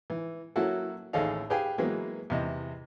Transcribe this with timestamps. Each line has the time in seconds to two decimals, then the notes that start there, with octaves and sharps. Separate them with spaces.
0.10 E3
0.56 F#3 A#3 C#4 E4 F#4 A4
1.13 A1 D#2 G#4 A4 D#5 F5
1.50 G4 G#4 B4 F5 G5 G#5
1.78 E3 F#3 G#3 A#3 B3
2.30 E2 C3 D#5